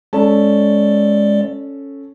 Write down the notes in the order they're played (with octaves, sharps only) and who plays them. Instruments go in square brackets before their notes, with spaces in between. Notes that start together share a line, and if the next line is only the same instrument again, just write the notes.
[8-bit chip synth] G#3 D5 [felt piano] C#4 A4 A5